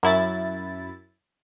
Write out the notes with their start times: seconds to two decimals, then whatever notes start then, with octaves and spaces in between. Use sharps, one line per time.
0.03 F#2 E4 A6